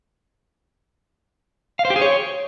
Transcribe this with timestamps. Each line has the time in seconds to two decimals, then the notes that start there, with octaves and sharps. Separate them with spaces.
1.79 F5
1.85 C5
1.90 G4
1.96 G#4
2.01 C#5